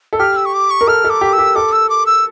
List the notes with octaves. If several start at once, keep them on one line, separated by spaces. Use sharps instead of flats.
A4
G4 F6
E6
C#6
D6
C#6
A#4
A4 F6
A4
D6
G4
E6
G4
A4 D6
E6
D6
E6